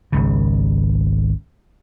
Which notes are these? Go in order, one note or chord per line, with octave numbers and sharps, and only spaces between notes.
G#1 C#2 C#3